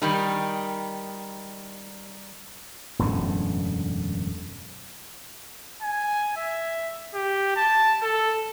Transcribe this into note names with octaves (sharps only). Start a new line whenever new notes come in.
D#3 G3 D#4
E1 F#2 A2 D3
G#5
E5
G4
A5
A4